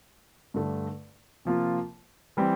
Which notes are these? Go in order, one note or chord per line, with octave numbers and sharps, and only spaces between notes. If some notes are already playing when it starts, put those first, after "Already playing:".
G2 D3 A3
C3 F3 A#3 F4
E3 G3 C4